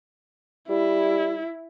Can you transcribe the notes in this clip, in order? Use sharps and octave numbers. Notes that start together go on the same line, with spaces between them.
G3 E4